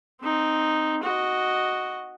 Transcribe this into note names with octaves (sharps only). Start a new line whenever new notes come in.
C4 D#4
F#4 D#5